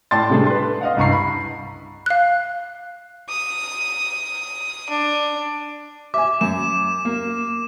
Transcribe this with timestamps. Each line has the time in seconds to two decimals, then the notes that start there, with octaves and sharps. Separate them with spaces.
0.11 A2 D5 G5 A5 C6 A6
0.30 C3 G3 A3 D4 G#4
0.47 B4 C6
0.81 D#5 F5 F#5
0.97 C2 G2 A#5 C#6 C7
1.12 B5
2.06 F5 F#6
3.29 D#6
4.90 D4
6.14 E5 G#5 D6
6.41 F#2 E7
7.05 A#3